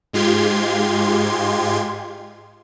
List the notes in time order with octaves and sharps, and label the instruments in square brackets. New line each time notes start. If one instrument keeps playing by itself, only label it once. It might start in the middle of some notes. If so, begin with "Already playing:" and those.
[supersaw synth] G#2 G#3 F4 G4 C6 G#6